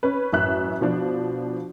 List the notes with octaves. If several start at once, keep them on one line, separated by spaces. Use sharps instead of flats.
C#4 B4
A1 F#2 E5 F#6
B2 F3 D4